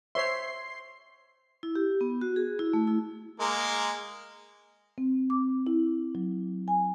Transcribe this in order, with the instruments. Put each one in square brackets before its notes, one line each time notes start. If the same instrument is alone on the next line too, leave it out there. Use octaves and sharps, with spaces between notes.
[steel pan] C5 C#5 E5 [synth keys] C6 C7
[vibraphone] E4
G4
B3
F#4
G#4
E4
A3
E4
[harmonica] G#3 A#3 A#4
[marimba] C4
D6
E4
F#3
G#5